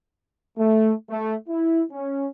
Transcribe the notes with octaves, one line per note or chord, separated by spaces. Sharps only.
A3
A3
E4
C#4